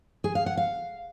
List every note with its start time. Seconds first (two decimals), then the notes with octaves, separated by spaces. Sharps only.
0.24 G#4
0.35 F5
0.46 F#5
0.57 F5